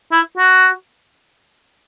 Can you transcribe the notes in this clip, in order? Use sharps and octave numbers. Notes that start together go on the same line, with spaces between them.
E4
F#4